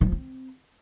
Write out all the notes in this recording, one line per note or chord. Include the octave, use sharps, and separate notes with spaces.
D#3
F3
C4